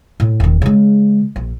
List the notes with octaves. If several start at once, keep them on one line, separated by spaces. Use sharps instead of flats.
A2
D#1 D#3
C#3 G#3
A#1